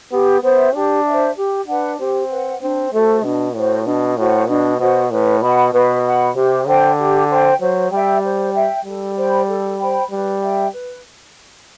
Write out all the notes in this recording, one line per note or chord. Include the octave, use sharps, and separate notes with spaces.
B3 G4
B3 C5 E5
D4 G4
C5 E5
G4
D4 B4 F#5
C4 G4
B4 F#5
C4 D4
A3 F#4 A4 C5
B2 D4
A2 F#4 A4 C5
B2 D4
A2 F#4 C5 F#5
B2 D4
B2 F#4 C5 F#5
A2 B4
B2 F#5 B5
B2 B4
F#5 B5
C3 G4
D3 C5 G5
G4
C5 G5
F#3 C5
G3 E5 G5
C5
E5 G5
G3 A4
C5 G5 B5
A4
C5 G5 B5
G3 B4
E5 G5
B4